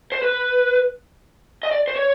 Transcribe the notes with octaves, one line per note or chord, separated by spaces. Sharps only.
C5
B4
D#5
D5
C5
C#5